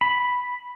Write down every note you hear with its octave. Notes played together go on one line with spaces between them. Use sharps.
B5